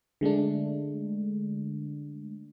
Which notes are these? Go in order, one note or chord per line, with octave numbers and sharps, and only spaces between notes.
D3 G#3 A3 D4